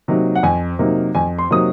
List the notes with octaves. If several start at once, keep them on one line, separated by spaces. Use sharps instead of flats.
C3 F#3 A#3 D#4
F#5
F2 G#5
C3 F#3 A#3 D#4
F2 G#5
C6
C3 F#3 A#3 D#4 D#6